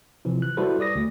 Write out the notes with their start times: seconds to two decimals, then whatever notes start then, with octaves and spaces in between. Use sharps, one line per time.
0.25 C3 E3 F3
0.42 F#6
0.57 G3 E4 F#4 A4 B4 C5
0.80 D5 D#6 A#6
0.95 D2